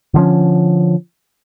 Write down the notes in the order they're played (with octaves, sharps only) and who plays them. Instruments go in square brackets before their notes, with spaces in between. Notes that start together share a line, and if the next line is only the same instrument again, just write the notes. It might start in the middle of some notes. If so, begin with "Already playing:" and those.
[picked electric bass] D3 F3 C#4